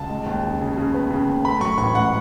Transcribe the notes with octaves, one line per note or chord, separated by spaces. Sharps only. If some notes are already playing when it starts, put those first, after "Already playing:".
Already playing: C#2 A5
G#3
D#2
C#3
C#3
C#3
B3
C#3
D#2
A3 B5
F#3 C#6
A1 C#6
G#2 F#5